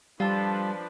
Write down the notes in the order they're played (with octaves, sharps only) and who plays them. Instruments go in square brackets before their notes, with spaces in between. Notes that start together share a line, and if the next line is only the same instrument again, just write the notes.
[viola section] F3 D4 B4 [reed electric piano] G3 [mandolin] F4 A4